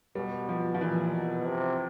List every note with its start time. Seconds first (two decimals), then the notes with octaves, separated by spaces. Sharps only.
0.15 B2 G3
0.49 F3
0.74 F3
0.81 A#2 E3
1.13 B2
1.47 C3